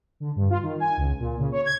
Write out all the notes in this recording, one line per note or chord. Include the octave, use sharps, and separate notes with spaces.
D3
G2
F4
D#3
G#5
C#2
A#2
C#3
C#5
G#6